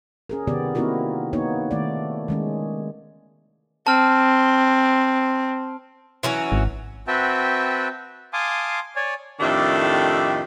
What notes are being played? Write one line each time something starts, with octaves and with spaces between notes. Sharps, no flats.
C#4 G#4 A#4
C3 D#3 B3 G4 D5
A#3 C4 D#4 E4 F#4 A#4
A#3 B3 D#4 C#5
D#3 A3 D5
D#3 G#3 C#4
C4 A5 F6
E3 F#3 C#4
G#1
C4 F#4 B4 E5 G5 A5
F5 G#5 A5 C6 D6 D#6
C#5 D5 G#5
F2 A2 D#3 D4 G4 E5